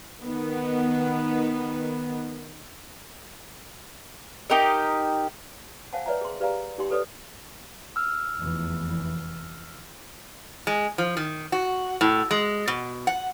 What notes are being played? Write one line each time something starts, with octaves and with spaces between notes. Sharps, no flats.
D#3 B3
D#4 G4 A#4 D#5
C5 F5 F#5 G#5 A5
B4 C#5 D5 E5 G#5 A#5
G#4 C6
G4 B4 D5 F5 G#5 A#5
D#4 G4 G5 C6
G4 A4 B4 C#5 D5 D#6
E6 F6
F1 E2 E3
G#3
F3
D#3
F#4
A2
G#3
B2
F#5